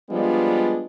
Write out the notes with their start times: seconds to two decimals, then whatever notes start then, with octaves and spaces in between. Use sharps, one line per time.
0.10 F3 G3 G#3 B3 D4 F4